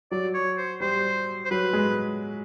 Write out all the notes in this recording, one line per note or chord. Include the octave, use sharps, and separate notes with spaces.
F#3 D5
C#5
C5
G3 C5
C5
F#3 B4
G#3